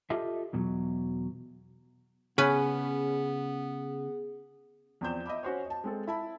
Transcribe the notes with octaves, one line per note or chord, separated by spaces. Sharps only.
F4 G4 A4 D#5 E5
E2 B2 F#3
C#3 B3 C#4 G#4 B4
E2 F3 C4 D5 G6 E7
D#5 E5 B5 D6
C#4 F#4 C5 C#5
D#5 A5
G#3 C4 A4
E4 A5 B5